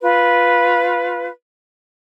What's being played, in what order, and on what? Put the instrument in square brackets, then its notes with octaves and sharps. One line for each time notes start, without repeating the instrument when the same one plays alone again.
[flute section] F4 B4